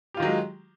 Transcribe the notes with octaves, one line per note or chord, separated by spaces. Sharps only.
D#3 F#3 G#3 F4 G4